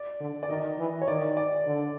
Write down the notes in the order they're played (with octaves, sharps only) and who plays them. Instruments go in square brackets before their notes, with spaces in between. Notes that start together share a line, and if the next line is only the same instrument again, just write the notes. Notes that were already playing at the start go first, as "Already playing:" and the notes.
Already playing: [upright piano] D5
[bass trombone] D3
[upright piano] D5
[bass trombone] D#3 [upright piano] D#5
[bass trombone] E3
[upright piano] C#5
[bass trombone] D#3 [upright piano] D5
[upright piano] D5
[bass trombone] D3